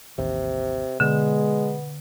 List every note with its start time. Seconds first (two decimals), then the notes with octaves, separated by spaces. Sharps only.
0.18 A1 D#2 C3
1.00 B2 D3 G#3 B3